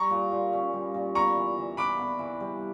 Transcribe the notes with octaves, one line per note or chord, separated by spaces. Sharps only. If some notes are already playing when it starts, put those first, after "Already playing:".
Already playing: G3 A#5 C#6
A#2
A#2
C#4
G3
A#2
B3 A#5 C#6
E3
E3
D4 B5 D6
B3
E3
G3